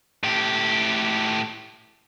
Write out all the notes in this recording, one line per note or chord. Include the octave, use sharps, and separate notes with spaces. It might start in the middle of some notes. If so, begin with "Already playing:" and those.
A2 G4